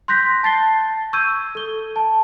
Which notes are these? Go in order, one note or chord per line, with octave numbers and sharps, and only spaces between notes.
C6 F#6 G6 A#6 B6
A5 A6 C7 G7
C#6 E6 G6 G#6 D#7
A4 G7
A5